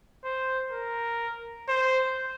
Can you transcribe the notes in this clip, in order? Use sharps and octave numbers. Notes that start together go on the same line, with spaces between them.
C5
A#4
C5